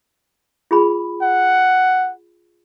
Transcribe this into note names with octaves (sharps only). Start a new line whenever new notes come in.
F4 G#4 B5
F#5